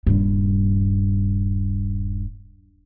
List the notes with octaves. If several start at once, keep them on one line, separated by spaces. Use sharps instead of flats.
D#1 G2